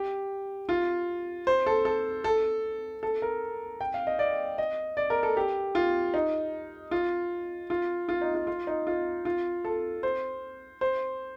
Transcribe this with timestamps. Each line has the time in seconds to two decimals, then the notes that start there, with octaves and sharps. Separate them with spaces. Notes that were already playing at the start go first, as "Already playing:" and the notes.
Already playing: G4
0.69 F4
1.47 C5
1.66 A4
1.85 A4
2.24 A4
3.03 A4
3.22 A#4
3.81 G5
3.94 F5
4.07 D#5
4.19 D5
4.58 D#5
4.97 D5
5.10 A#4
5.23 A4
5.37 G4
5.75 F4
6.14 D#4
6.91 F4
7.70 F4
8.09 F4
8.21 D#4
8.35 F4
8.47 F4
8.67 D#4
8.87 F4
9.25 F4
9.65 A4
10.03 C5
10.81 C5